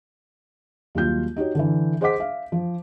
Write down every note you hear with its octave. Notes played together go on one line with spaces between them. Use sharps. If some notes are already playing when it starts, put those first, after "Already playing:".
D#2 F#3 G3 F4 G6
D#4 F#4 G4 C#5
D3 E3
G#4 C5 D#5 F#5 D6 B6
E5 F5
F3